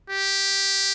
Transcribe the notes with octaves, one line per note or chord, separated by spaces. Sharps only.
G4